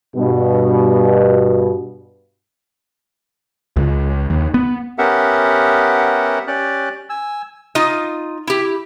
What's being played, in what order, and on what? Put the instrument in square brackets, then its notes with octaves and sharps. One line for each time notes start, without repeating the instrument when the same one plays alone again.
[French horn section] G2 B2
[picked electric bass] C#2
D#2
B3
[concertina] B3 C#4 G4 A#4 E5 F#5
C#4 G4 D5 F#6
G#5 E6
[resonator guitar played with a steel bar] D#4 F4 D#5
E4 G4